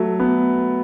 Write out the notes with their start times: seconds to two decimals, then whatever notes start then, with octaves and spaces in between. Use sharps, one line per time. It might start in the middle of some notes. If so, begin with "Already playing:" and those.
Already playing: F#3 A3
0.20 B3